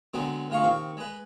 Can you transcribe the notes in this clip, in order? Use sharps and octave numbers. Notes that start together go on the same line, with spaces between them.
D3 F#3 G#3 B3 C4
D2 G#3 F4 F5 C#6
D#2 C4 C#6
G#3 B4